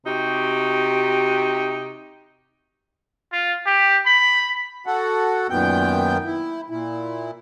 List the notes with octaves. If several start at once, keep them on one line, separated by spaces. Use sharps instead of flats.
C3 D#4 F#4 G4
F4
G4
B5
F#4 A4 F#5
F#2 A#2 D#3 B3 G5 G6
E4
A#2 E4